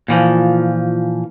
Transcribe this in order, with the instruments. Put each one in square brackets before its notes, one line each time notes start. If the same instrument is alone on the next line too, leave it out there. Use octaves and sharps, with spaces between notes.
[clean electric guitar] A#2 E3 F3